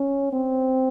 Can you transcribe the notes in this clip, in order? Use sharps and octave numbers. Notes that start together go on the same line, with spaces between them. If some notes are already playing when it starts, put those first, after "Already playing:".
Already playing: C#4
C4